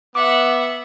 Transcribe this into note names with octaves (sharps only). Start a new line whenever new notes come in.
B3 E5 F#5 D6